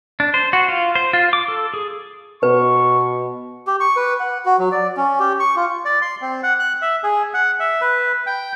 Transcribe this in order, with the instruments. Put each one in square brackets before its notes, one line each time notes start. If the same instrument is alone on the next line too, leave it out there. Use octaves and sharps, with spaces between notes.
[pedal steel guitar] D4
C5
F#4
F4
C5
F4
D6
A4
G#4
[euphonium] B2 [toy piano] B4 [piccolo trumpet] C#6
[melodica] G4
C#6
B4
F#5
F#4
F#3
D5
C#4
G4
C#6
F4
[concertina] D5
C6
C4
F#5
F#6
E5
G#4
F#5
E5
B4
G5